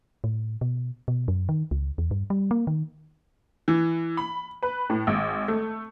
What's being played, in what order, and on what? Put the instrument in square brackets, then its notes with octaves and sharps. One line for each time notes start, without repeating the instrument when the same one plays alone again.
[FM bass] A2
B2
B2
F#2
D#3
C#2
E2
G2
G3
A#3
D#3
[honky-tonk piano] E3
B5
B4
A2
G#1
A3